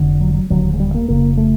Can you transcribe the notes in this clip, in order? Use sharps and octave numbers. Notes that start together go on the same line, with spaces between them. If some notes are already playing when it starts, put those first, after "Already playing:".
Already playing: F1 F2 D3
F#3
F#3
E1 D#2 D3 F#3
G#3
G3
A#3
F1 F2 C#3 A#3
A3